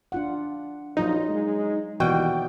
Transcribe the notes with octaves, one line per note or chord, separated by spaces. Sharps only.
D4 F4 F#5
A#1 F#3 D#4 F4 D#5
G#3
D#2 B2 E3 D5 G5